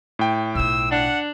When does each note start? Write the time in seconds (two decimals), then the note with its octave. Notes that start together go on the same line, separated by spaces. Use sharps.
0.19 A2 G5
0.55 B1 F4 E6
0.91 D4 F#5